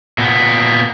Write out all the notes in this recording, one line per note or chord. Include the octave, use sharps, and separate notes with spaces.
A#2 B3